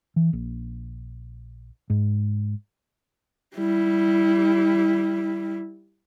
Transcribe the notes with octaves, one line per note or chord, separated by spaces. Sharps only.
E3
A#1
G#2
G3 E4